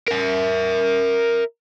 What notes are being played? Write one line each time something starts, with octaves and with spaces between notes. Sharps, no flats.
A#4 E5